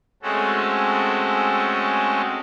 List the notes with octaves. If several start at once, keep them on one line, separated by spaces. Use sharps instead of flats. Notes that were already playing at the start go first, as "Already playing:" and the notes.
G#3 A3 C4 C#4 F#4 A4